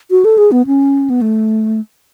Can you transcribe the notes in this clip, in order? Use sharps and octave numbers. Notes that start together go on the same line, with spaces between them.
F#4
A4
G#4
B3
C#4
B3
A3